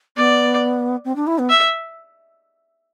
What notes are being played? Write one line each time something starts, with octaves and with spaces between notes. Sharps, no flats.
B3 D5
C4
D4
E4
B3
E5